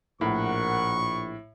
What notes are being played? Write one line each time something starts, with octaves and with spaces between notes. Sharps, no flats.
A#1 A2 A#4 F#5 C#6